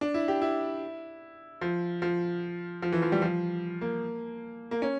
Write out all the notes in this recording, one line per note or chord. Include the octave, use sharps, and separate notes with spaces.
D4
E4
G4
E4
F3
F3
F3
E3
F3
G3
F3
A#3
A#3
C#4